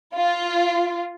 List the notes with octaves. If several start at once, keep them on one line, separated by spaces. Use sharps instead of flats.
F4